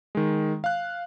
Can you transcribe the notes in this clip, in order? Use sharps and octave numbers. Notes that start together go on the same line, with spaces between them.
D#3 G#3
F5 F#6